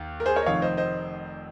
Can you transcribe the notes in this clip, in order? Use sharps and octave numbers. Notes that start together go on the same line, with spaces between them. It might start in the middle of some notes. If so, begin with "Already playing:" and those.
Already playing: D#2 D#3
A#4
G#4 C5
A#4 C#5
D#5
F1 F2 D#3 C#5 F5
C5 D#5
C5 D#5